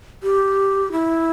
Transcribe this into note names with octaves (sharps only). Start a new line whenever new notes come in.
G4
E4